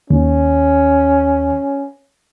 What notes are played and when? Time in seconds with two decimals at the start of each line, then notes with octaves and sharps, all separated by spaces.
0.10 D#2 C#4